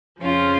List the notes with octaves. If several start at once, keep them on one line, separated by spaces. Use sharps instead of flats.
F2 C#3 F3 C#4 F4